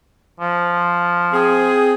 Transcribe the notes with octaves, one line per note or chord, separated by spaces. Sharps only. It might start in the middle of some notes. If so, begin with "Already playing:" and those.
F3
C4 G#4